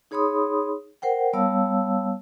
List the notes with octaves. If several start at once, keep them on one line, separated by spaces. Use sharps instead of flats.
D#4 G#4 C#5 B5 C6 D#6
A#4 C5 F#5 G5
G3 B3 C#5 F5 A5 E6